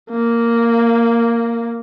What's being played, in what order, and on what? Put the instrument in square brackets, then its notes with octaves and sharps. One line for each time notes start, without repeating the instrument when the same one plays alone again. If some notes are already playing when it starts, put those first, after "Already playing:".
[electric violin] A#3